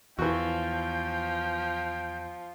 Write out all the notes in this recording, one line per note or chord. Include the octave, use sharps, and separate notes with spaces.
E2 E3 F3 F#4 G5